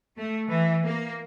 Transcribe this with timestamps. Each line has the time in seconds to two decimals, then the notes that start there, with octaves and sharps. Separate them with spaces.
0.17 A3
0.48 E3
0.84 A#3